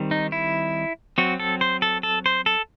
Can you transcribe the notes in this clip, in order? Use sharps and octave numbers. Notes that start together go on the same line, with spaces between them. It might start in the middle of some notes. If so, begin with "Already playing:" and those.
Already playing: D#3 G3 C4
D#4
E4
F#3 C4 F#4
A4
C5
A4
A4
C5
A4